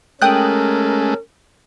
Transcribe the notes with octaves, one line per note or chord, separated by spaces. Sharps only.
G#3 A3 C#4 A#4 G5 D#6 F#6